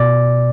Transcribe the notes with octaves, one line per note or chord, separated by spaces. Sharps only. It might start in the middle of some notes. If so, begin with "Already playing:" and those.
Already playing: B2 D5